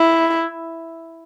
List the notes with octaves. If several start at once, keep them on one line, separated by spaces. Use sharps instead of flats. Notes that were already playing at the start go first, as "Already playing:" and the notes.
Already playing: E4